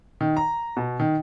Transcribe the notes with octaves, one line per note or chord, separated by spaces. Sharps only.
D#3
A#5
B2
D#3